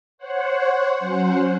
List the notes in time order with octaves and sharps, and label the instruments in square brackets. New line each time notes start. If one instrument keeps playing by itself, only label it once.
[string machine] C5 C#5 F#5
F#3 C#4 C5 F#5